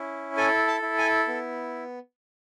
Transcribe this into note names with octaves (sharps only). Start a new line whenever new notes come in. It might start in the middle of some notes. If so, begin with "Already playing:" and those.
Already playing: C#4 E4
A4 G#5
A5
E4
G#5
B3